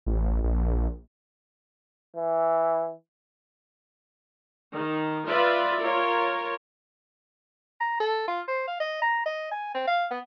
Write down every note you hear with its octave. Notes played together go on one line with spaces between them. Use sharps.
A1
A#1
E3
D#3
F4 B4 D5 E5
F4 A#4 C#5
A#5
A4
F4
C5
F5
D#5
A#5
D#5
G#5
C4
F5
B3